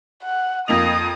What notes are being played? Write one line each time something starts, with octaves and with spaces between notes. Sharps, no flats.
F#5
F2 A#3 D#5 D#6 F7